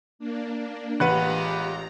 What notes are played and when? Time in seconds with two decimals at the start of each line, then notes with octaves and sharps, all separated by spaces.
0.19 A#3 D4
1.00 A1 G#3 F4 G4 B4 F#5 A#5 F#6